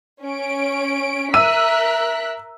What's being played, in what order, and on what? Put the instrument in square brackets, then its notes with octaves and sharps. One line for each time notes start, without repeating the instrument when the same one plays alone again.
[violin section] C#4 C#5 D7
[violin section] A#4 F#6 B6 [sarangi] E5 [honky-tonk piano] E6 D#7